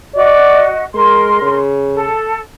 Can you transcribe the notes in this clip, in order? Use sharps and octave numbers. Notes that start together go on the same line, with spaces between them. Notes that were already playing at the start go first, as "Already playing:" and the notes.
F#4 D5 D#5
G#3 A#4 C6
C#3
A4